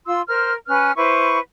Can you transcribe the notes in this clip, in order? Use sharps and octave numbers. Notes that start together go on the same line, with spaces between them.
F4 C6 E6
A#4 C5 F6
C#4 B4 F6 F#6
E4 B4 C5 C#6